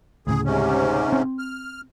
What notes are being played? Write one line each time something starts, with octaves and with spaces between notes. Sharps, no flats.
D2 A2 C#3 G#4
G#2 C3 C#4
C4
F6